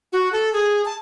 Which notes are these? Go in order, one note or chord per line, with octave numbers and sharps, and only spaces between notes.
F#4
A4
G#4
A5